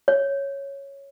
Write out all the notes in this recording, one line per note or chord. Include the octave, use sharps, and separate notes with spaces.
C#5